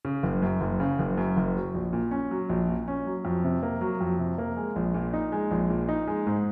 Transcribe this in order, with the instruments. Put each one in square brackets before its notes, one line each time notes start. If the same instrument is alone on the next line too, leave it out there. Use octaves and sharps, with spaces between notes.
[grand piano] C#3
F#1
F#2
F#1
C#3
F#1
F#2
F#1
F#3
A#1
A#2
C#4
F#3
A#1
A#2
C#4
F#3
F2
C3
A#3
F#3
F2
C3
A#3
G#3
A#1
A#2
D#4
G#3
A#1
A#2
D#4
G#3
G#2